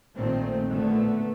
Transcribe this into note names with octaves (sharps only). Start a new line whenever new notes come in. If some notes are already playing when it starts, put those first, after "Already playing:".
A#1 A#2 D#3 A3 C4
A#2 D3 A3 B3